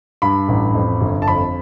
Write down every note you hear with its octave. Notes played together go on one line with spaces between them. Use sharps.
G2 B5
A1
F2
G1
A5
F2 B5